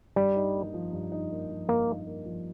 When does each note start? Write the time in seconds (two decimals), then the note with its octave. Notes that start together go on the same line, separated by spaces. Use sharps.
0.16 G2 G3
0.36 D#4
0.54 A#3
0.74 F3
0.92 G2
1.12 D#4
1.31 A#3
1.50 F3
1.68 G2 A#3
1.88 D#4
2.07 A#3
2.26 F3